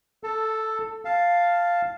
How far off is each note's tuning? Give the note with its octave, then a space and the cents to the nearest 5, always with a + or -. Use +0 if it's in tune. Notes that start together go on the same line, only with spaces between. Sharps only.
A4 +0 A5 +20
F5 +0 A5 +0